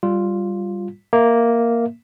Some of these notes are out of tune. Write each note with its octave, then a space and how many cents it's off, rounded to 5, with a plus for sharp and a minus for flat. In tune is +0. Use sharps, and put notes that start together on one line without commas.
G3 +0 F4 +0
A#3 +0 E5 +0